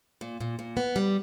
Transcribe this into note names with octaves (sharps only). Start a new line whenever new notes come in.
A#2
A#2
A#2
B3
G3